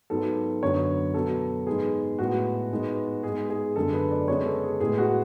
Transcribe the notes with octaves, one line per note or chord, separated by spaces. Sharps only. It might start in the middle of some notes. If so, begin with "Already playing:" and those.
G#2 F#3 B3 A4
F#2 D3 F#3 B3 C#5
B2 F#3 B3 A4
G#2 G#3 B3 G#4
A2 G#3 B3 F#4
G#2 G#3 B3
G#2 G#3 B3 G#4
G#4
F#2 D3 G#3 B3 A4
B4
D5
C#3 G#3 B3 C#5
A4
G#4
A2 G#3 B3 G#4
F#4